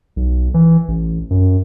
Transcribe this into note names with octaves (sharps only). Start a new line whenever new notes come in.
B1
E3
A1
F#2